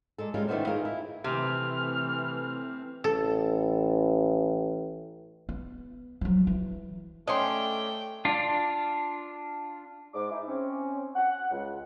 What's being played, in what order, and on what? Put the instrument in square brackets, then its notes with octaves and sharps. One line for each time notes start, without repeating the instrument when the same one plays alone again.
[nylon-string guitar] A#2 G#3 A4
G3 G#3 A#3 C#4 F4
D#3 E3 A3 B3 C#4 C5
F4 G#4 A#4 F5
E4
[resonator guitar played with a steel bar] C3 [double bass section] E3 A3 [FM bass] C4 [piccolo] F6
[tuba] A1 [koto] A4
[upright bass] B3
F3 F#3
E3
[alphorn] A3 [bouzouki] C#4 D4 [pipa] D#5 C6 [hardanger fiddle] G5
[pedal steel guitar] D4 F4
[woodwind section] G#2 D6
D#4 E4
C4 C#4
F#5
C#2